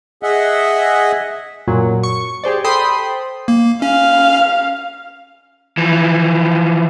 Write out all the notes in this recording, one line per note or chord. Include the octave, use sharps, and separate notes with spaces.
G#4 D#5 E5 F#5
F#2 A#2 F#3
C#6
G4 G#4 C5 D5
A4 C5 G5 B5 C6 D#6
A#3
C#4 F5
E3 F3